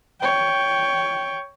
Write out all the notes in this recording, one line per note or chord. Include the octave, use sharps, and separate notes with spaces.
C#5 G5